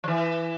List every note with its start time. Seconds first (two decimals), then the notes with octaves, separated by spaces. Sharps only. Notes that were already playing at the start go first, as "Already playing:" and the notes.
0.04 F3
0.08 E3